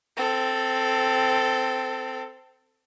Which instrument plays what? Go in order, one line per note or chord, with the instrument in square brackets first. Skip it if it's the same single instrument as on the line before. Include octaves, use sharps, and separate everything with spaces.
[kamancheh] C4 A4